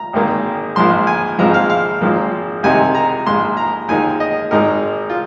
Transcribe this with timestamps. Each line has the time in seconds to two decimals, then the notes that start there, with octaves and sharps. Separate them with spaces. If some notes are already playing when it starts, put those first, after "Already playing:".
Already playing: A#5
0.13 G#1 G#2 D#3 A#3
0.76 A#1 G#2 F3 C6
1.07 G#5
1.38 A#1 G#2 F3 G#3 C4 A#5
1.54 F5
1.70 F5
2.01 G#1 G#2 F3 A#3
2.63 C2 C3 D#3 G#3 D#4 G#5
2.95 A#5
3.26 A#1 G#2 G#3 C6
3.57 A#5
3.88 D#2 D#3 G#3 D#4 G#5
4.20 D#5
4.51 G#1 G#2 G#3 D#4 A#4
5.10 F4